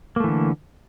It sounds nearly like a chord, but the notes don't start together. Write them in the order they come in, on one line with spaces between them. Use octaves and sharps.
A#3 A3 E3 D3